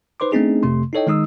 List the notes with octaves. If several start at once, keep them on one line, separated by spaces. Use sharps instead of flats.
D#4 B4 C5 C6 D6
A3 B3 C4 D4 D#4 G#4
F2 C3 A3 C6
D#4 E4 A4 C#5 D#5 G5
D#3 G#3 D#4 D#6 E6